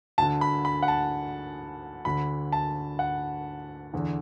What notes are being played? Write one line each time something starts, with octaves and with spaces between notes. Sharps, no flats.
D2 D3 A5
B5
B5
F#5
A5
D2 D3 B5
A5
F#5
E2 D3